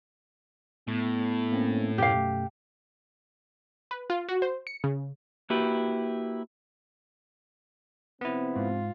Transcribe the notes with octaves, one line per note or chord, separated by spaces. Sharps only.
A2 B3
A#3 C4 C#4
F#2 B2 A3 G4 F5
B4
F4
F#4
C5
C#7
C#3
A#3 E4 F#4 G4 B4
C3 F3 B3 C4 E4
G#2 F4